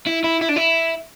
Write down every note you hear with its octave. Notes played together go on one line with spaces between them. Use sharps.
E4
E4
E4
D4
E4